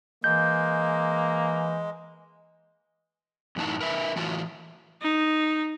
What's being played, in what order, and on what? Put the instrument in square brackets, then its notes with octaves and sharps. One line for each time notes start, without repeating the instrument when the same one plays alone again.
[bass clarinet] E3 [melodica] G#3 [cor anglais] A#3 [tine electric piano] G6
[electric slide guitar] F#2 A2 E3 F#3 D#4 A5
A#4 B4 E5
A2 E3 F4 F#4 A5
[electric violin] D#4